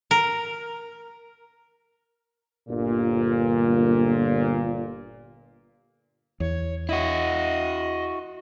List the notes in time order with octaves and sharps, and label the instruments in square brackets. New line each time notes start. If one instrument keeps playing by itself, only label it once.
[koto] A#4
[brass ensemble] G1 A#2
[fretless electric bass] E2 [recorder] C#5
[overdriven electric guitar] E4 F#4 [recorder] D#5